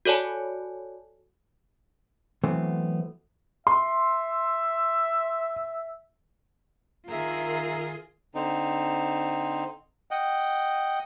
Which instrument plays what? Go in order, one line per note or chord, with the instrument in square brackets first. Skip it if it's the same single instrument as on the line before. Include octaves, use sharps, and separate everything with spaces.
[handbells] F#4 A4 C#5 D5 G#5 A5
[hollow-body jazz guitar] E3 F#3 A3 B3 C4
[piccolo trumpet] E5 [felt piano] C6
[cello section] D#3 A#4 [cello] F4 G#4 [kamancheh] E5 A#5
[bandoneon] D3 C4 D#4
D#5 F#5 G5